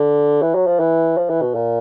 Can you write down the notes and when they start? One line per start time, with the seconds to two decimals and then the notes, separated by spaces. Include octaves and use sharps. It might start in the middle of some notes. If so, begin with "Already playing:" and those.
Already playing: D3
0.42 E3
0.55 F#3
0.67 F3
0.80 E3
1.17 F3
1.30 E3
1.42 B2
1.54 A#2